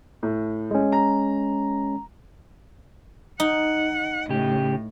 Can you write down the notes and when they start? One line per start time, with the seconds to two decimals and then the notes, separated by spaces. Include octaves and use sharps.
0.23 A2
0.71 G#3 C#4
0.92 A#5
3.40 D#4 F#5
4.29 A2 C#3 G4